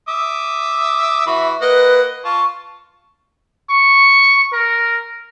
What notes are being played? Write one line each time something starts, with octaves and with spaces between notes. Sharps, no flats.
E5 D6 D#6
E3 F#4 E5 B5
A#3 B4 D#5 F#5
F4 A5 C#6
C#6
A#4